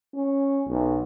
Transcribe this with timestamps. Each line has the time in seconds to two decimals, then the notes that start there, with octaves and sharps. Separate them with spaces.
0.14 C#4
0.66 B1